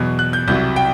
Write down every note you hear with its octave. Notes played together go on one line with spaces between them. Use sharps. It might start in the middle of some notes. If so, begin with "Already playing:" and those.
Already playing: E2 B2 F#3
F#6
G6
C2 C3 F#3 G6
G5